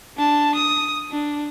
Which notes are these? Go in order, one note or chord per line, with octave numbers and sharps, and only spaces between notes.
D4 A5
D#6
D4